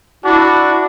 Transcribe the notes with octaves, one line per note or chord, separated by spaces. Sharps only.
D4 E4 F#4